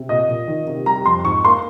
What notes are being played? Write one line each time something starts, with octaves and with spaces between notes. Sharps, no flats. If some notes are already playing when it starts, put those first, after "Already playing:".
Already playing: C3
A#2 D#5
A#2
D#3
C3
G3 A#5
F2 C6
G#2 C#6
A#3 C6